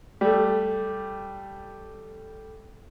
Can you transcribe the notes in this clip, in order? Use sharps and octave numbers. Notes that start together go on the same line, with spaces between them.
G3 A3